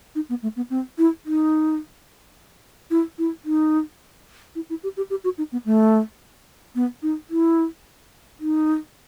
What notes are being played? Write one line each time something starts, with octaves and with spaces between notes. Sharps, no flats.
D#4
B3
A3
B3
C4
E4
D#4
E4
E4
D#4
E4
E4
G4
G4
G4
F#4
D#4
B3
A3
B3
D#4
E4
D#4